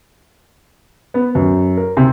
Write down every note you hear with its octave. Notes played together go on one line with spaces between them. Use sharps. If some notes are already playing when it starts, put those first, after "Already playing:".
B3
F#2
A#4
C3